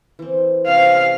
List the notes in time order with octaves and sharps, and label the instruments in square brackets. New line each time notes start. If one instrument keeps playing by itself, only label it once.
[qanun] E3 C4
[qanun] C3 C#4 [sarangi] F5